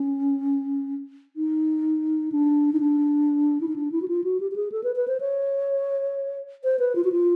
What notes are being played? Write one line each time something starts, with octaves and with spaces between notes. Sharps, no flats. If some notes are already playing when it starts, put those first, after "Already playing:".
Already playing: C#4
D#4
D4
D#4
D4
E4
D#4
D4
E4
F#4
F4
F#4
G4
G4
G#4
A4
B4
B4
C5
C#5
C5
B4
F4
F#4
F4